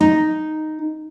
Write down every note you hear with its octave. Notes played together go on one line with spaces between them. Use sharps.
D#4